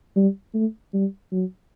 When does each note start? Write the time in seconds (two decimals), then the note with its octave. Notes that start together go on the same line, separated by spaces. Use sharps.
0.16 G3
0.54 A3
0.93 G3
1.32 F#3